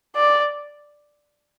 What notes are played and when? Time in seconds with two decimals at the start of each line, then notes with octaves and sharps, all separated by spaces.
0.16 D5